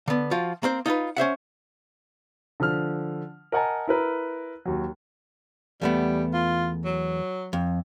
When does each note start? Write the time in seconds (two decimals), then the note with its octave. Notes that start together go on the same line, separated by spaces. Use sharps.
0.08 D3 B3
0.31 F3 F4 F#4
0.63 A#3 C4 C5
0.86 D#4 F4 A4 B4
1.17 C#4 C5 E5 F#5
2.60 D3 F3 F6
3.52 A#4 D#5 F#5 G#5 A5
3.88 E4 A#4 B4
4.65 D#2 F#3
5.81 E2 G3 A3 B3
6.34 F4
6.85 F#3
7.53 F2